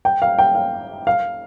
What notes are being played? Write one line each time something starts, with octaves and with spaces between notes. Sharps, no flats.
G5
F5
G5
F5
F5